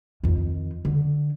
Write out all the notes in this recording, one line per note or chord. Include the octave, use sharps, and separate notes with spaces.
F2 D#3
D3